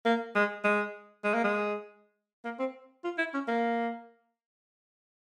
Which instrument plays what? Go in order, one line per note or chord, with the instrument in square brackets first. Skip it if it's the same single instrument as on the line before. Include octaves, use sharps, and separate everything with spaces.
[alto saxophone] A#3
G#3
G#3
G#3
A#3
G#3
A#3
C4
F4
E4
C#4
A#3